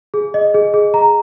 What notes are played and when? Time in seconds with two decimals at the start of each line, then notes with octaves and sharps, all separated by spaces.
0.14 G#4
0.34 D#5
0.54 G#4
0.74 G#4
0.94 A#5